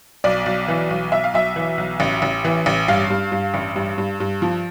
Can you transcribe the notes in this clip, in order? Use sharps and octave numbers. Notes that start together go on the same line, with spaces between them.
B1 D5
B1
E3
B1
B1 E5
F5
B1 E5
E3
B1
A1
A1
E3
A1
G2 F5
G2
G2
A1
G2
G2
G2
F3